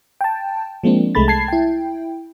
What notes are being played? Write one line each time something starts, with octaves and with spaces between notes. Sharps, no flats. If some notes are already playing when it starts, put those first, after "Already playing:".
G5 A5
F3 G#3 A#3 C4 D4
C2 G#3 A3 B5 A6
A5 G#6 C7
E4 G5